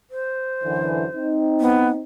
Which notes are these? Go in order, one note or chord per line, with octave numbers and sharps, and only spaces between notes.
C5
F#2 D3 E3
C4 D#4
B3